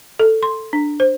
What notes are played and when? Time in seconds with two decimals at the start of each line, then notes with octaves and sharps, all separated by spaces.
0.20 A4
0.43 C6
0.73 D4
1.00 C5